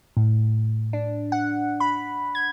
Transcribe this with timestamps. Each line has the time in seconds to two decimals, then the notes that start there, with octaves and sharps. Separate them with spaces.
0.17 A2
0.93 D4
1.32 F#5
1.80 B5
2.35 G#6